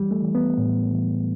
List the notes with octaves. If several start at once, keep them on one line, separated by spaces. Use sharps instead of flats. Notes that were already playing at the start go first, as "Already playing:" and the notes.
Already playing: E3 G3
A3
E3
B3
A2
E3